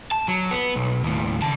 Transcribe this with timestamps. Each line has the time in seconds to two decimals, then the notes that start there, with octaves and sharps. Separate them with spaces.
0.11 A5
0.28 F#3
0.51 B3
0.76 B1
1.04 D#2 A2
1.42 C#3 A5